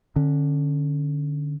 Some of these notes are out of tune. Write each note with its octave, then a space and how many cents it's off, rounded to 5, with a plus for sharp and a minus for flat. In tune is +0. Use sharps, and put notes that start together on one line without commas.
D3 +15 C#4 -15